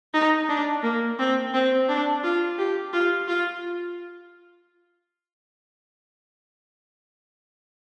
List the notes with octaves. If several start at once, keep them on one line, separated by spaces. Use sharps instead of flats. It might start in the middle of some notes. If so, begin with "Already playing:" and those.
D#4
D4
A#3
C4
C4
D4
F4
G4
F4
F4